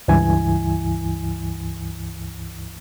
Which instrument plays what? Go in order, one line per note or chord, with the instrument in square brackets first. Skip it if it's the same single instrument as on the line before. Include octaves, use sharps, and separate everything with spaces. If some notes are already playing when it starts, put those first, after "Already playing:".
[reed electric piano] C#2 G2 E3 E4 G#5